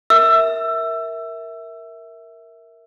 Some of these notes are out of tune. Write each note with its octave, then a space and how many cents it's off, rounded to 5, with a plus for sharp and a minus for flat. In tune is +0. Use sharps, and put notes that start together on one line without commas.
A#4 +0 E5 -15 E6 +20